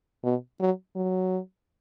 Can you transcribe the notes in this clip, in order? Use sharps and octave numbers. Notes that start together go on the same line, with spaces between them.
B2
F#3
F#3